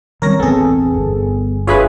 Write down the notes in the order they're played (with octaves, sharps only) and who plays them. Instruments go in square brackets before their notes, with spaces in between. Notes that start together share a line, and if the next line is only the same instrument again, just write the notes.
[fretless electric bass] D#3 G3 C4 [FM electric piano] A#4 C#5 A#6
[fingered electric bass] E1 A1 C4 [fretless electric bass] E3 [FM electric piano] B3 G#4 [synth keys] A4
[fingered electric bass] G1
[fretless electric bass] F#1 D4 [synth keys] F4 G#4 B4 [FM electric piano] C#5 E5 B5